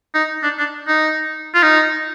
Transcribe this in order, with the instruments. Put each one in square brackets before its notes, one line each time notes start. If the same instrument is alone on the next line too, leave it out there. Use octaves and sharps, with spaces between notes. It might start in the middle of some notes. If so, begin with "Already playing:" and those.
[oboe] D#4
D4
D4
D#4
F4
D#4